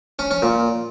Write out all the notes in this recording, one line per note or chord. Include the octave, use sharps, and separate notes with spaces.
C#4
C#4
A#2